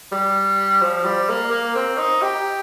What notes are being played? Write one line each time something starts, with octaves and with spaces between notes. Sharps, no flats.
G3
F3
G3
A#3
A#3
C4
D#4
G4